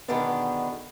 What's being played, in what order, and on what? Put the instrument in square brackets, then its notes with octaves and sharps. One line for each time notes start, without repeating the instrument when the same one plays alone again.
[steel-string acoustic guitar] B2 D3 D#3 G#3 B3 D4